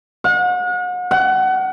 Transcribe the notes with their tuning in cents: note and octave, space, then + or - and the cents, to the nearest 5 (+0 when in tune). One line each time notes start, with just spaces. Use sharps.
F#5 -40
F#5 +25